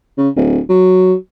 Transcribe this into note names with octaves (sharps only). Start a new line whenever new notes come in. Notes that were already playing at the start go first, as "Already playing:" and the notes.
C#3
D1
F#3